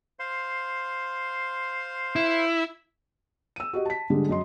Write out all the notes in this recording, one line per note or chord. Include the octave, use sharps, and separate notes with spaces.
C5 F5 C6
E4
E6 D#7
F#4 G4 D#5
A5 B6
G#2 D3 G3 G#3
F#2 D#5 C6